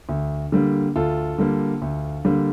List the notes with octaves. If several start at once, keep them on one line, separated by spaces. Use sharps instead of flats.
D2
D3 G3 A#3
D2 F4 A4
D3 G3 A#3
D2
D3 G3 A#3